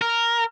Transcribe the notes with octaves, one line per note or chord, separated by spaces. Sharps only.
A#4